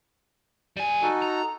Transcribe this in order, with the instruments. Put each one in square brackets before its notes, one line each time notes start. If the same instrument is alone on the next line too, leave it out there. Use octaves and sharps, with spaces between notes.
[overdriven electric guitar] G3 G#5
[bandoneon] D#4 F#4 A4
[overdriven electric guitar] A#5